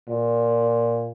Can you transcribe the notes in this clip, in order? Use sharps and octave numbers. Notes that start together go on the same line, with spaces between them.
A#2